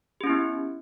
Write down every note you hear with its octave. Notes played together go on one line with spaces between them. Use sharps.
B3 C#4 E4 G4